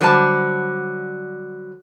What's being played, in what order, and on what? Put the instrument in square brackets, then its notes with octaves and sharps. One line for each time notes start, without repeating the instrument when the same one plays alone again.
[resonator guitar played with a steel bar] D3 F#3 G3 C5 E5 A5